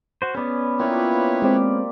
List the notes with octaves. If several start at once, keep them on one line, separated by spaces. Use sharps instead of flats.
F#4 C5
B3 C#4 B4 D5 G#5
A#3 C4 E4 F4 B4 C#5
G#3 C4 G4 D5